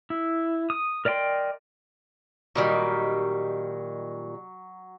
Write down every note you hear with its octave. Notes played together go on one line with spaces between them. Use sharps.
E4
D#6
A#4 D5 D#5 G5 C6
A#2 D#3 F#3 G3